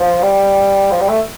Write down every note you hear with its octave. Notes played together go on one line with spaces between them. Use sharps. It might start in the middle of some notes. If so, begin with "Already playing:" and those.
Already playing: F3
G3
F3
G3
A3